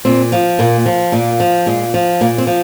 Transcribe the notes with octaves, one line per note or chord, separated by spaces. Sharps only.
A#2 C4
F3
A#2 A#3
F3
A#2 A#3
F3
A#2 G#3
F3
A#2 A#3
C4
F3